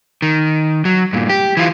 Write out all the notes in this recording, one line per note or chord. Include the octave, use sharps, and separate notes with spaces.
D#3
F#3
G2 A#2
G4
E3 F4